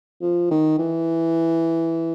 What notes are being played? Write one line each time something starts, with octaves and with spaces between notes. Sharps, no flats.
F3
D#3
E3